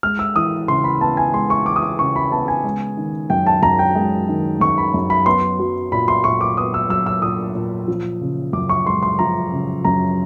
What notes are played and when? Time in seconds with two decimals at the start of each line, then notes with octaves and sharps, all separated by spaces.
0.03 G#3 F6
0.19 E6
0.35 E3 D#6
0.68 C#3 C6
0.84 B5
1.01 B3 A5
1.17 G#5
1.34 G#3 C6
1.50 C#6
1.66 E3 D6
1.76 D#6
1.83 D6
1.99 C#3 C#6
2.16 B5
2.32 B3 A5
2.48 G#5
2.64 G#3
2.97 D#3
3.30 F#2 G5
3.46 A5
3.62 F#2 A#5
3.79 G5
3.95 G#3
4.28 D#3
4.60 F#2 C#6
4.78 B5
4.94 F#2
5.10 B5
5.26 B3 C6
5.59 F#3
5.92 A#2 B5
6.08 C6
6.24 A#2 C#6
6.41 D6
6.57 B3 D#6
6.74 E6
6.90 F#3 E6
7.06 E6
7.22 A#2 D#6
7.55 A#2
7.88 F3
8.21 C#3
8.53 F#2 D6
8.69 C#6
8.86 G#3 C6
9.03 C6
9.19 F3 A#5
9.52 C#3
9.85 F#2 A#5